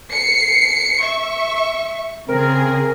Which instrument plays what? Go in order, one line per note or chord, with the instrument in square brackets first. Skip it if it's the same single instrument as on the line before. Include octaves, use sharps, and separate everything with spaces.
[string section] C7 C#7
E5 C#6
[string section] C#3 G#4 [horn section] C4 A#4